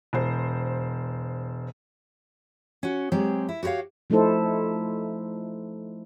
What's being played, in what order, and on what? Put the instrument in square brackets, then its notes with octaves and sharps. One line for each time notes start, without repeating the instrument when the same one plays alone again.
[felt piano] E1 C5
[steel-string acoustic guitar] C#4 F#4
F#3 G#3 C4 G4 G#4
E4
F#4 G4 A#4 C#5 F5
[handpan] F3 A3 D#4 E4 A4 C5